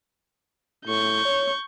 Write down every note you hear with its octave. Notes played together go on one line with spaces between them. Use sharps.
A2 C#6 G6
C#5